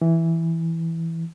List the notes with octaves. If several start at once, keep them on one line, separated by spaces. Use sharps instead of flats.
E3